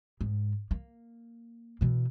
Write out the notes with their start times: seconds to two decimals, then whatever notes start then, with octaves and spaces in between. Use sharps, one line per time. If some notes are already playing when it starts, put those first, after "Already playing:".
0.21 G#2
0.71 A#3
1.81 B2 E3